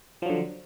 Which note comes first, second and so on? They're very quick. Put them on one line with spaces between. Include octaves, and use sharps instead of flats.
F3 F#3 D3